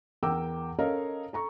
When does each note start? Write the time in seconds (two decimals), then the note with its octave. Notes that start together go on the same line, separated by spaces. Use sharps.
0.23 E2 A#4 G5 D6 E6
0.79 C#4 A4 A#4 C#5 D#5 F5
1.33 A4 A#5 C#6